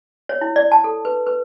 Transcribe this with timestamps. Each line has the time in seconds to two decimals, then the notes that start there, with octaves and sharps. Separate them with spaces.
0.29 C#5
0.41 E4
0.56 D5
0.72 A5
0.84 A4
1.05 B4
1.27 B4